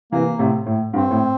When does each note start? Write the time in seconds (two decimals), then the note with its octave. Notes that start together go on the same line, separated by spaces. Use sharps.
0.12 C3 E3 A#3
0.39 A2 C3
0.66 A2
0.93 G2 C4
1.11 A2